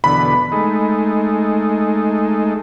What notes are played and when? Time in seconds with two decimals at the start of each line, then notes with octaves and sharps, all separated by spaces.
0.04 E2 B2 D3 B5
0.52 G#3 A3 D#4